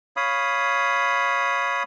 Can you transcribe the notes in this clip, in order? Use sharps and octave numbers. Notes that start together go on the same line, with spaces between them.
C#5 F5 B5 D#6